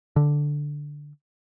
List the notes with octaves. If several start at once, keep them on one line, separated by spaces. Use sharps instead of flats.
D3